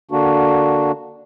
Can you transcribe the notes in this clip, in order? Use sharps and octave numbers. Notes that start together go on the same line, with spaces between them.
D3 A#3 D4 F#4